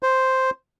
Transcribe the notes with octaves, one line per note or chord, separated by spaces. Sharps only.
C5